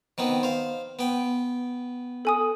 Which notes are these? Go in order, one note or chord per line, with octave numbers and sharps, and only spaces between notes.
D#3 B3 C4
C5 F5
B3 G5
A4 G#5 D#6